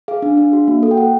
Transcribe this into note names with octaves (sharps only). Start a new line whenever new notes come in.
G#4 F5
D4
D4
F#4
A#3
A4
G5
A4 F#5